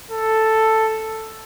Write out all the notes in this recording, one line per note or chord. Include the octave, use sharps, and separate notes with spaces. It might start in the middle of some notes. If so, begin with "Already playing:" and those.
A4